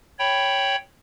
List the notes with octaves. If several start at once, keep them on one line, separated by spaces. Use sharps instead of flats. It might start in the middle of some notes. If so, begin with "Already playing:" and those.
C#5 G5 B5